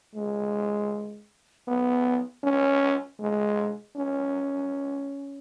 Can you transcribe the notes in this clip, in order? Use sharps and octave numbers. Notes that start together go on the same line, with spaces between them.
G#3
B3
C#4
G#3
C#4